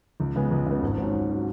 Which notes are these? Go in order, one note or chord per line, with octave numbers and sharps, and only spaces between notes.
C#2
C#3 G#3 B3
C#2
C#3 G#3 B3
G#1
G#2 F#3 C#4
G#1
F#3 C#4